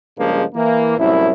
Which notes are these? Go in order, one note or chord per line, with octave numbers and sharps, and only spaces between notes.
G2 C#3 F3 G#3 A#3
E3 A#3
C2 F#2 A2 E4